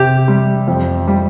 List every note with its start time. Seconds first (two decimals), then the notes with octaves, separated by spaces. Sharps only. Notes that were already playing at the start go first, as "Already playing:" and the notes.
Already playing: C3 G4
0.28 G3
0.68 F2
1.07 G3